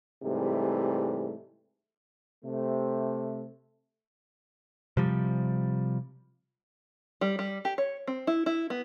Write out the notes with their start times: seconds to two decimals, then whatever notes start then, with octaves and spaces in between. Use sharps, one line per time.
0.23 G#2 C3 E3 G3 A3
2.45 C3 A3
4.97 C3 F3 G3
7.21 G3
7.39 G3
7.65 G4
7.78 C#5
8.07 C4
8.27 E4
8.46 E4
8.70 B3